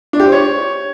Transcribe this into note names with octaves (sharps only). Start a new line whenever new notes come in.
D4
G4
C5
C#5